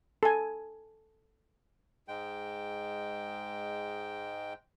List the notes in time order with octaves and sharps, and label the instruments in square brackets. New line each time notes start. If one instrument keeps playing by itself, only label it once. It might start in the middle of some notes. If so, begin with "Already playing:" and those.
[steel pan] A4 G#5
[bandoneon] G#2 G#3 G5